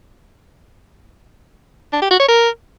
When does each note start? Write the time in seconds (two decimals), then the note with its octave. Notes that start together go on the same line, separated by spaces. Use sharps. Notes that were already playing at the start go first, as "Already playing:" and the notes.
1.93 D4
2.02 G4
2.10 F#4
2.19 C#5
2.28 A#4